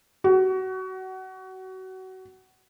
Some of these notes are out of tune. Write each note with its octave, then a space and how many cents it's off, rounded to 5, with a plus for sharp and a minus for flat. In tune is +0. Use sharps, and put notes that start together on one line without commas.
F#4 +25